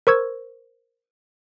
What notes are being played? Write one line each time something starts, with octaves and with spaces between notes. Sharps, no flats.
A#4 C5 C#6 E6 G#6